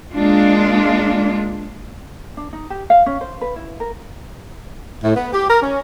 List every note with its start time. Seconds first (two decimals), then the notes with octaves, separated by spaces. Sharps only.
0.13 G#3 A#3 D4 F4
2.37 D4
2.53 D#4
2.70 G4
2.90 F5
3.06 C#4
3.21 C5
3.41 B4
3.56 E4
3.80 A#4
5.03 A2
5.14 B3
5.33 G4
5.48 A#4
5.62 C#4